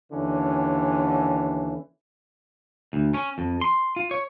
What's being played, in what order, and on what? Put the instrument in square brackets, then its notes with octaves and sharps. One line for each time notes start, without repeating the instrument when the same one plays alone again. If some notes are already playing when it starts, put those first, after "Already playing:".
[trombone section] D#2 D3 E3 C#4
[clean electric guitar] D2
C#4
F2
C6
F4
C#5